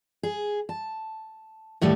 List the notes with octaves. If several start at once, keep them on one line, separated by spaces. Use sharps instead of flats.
G#4
A5
D#2 A2 G3 A3